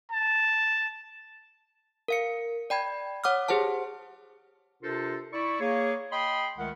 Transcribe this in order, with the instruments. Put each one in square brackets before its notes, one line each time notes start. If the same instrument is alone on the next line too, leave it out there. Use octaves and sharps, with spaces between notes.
[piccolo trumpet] A5
[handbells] A#4 F5 C#7
D5 G5 B5 G#6
C#5 F#5 D6 D#6 F6
G4 G#4 C5 F#5 A5
[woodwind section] C3 D4 F4 A4 A#4 C5
E4 D5 C#6
A#3 G#4 C#5
D#5 G5 B5 C6
C#2 D#3 A3 F#5